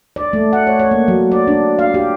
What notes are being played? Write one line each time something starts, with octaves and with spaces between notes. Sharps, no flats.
D5
A3
F#5
C#5
C#5
A#3
F#3
D5
D4
F5
G4